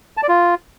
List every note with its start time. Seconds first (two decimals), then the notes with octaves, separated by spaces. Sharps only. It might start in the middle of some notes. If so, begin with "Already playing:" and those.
0.17 A5
0.23 D5
0.29 F4